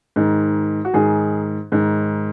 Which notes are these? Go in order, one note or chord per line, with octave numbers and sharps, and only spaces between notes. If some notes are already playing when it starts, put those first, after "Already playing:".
G#2 D#3
F#4
G#2 D#3 G#4
G#2 D#3